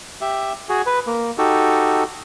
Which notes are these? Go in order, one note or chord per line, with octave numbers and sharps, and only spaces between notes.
G4 E5
F#4 G#4
B4
A#3
D#4 F#4 G4 A4